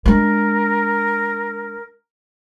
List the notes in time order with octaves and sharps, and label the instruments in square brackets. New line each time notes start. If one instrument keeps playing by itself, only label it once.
[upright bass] G#3 D4 [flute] A#4